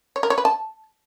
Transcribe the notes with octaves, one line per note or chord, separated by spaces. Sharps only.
C#5
A#4
C#5
B4
A5